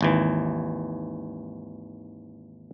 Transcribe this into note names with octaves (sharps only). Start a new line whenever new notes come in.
G#1 D#2 E3